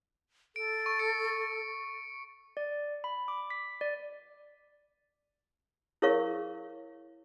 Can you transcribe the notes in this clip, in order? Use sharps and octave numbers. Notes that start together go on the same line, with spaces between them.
A4 D7
C#6
C#7
D5
B5
D6
B6
D5
E4 G#4 A#4 C#5 F5 C#6